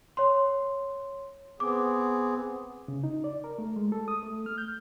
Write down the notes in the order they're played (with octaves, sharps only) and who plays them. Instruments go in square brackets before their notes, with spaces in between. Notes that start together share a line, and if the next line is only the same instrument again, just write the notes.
[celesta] C#5 C6
[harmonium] B3 C4 G#4 [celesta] D6
[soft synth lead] C#3
D#4
D5
A#4
A3
G#3
A4
D#6
A3
F6
G6